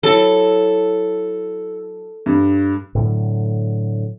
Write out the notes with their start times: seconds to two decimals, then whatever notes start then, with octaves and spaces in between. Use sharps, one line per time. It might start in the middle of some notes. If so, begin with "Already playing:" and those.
0.03 F#3 E4 A4
2.26 G2
2.95 A2 D3 F#3